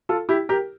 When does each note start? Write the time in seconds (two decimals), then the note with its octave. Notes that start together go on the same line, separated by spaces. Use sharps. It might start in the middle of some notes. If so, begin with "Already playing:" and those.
0.09 F4 A4
0.29 E4 G4
0.49 G4 A#4